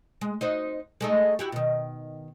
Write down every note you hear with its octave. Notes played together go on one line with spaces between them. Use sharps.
G#3
D#4 F#4 C5
G#3 A3 D#4
E4 F#4 G4
B2 D#3